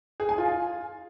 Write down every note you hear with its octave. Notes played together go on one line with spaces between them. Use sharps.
G#4
G#5
F4